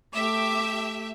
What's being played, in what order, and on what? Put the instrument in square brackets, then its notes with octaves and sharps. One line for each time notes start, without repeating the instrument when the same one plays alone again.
[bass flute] A3 [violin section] G4 E5 [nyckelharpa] D6